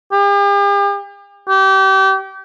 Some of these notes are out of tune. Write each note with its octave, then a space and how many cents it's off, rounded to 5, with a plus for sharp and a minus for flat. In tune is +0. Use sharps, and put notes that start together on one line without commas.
G4 +45
G4 -30